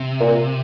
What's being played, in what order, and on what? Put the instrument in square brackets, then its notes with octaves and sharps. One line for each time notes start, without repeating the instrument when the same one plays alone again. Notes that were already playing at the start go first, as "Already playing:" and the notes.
Already playing: [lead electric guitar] C3
[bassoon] A#2